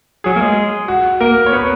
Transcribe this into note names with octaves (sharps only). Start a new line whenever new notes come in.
F#3 G#4
A#3
G#3
F#4
A#3 A#4
C#5
B3 B4